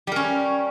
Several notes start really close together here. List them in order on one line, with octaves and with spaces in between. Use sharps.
G3 A#4 C#4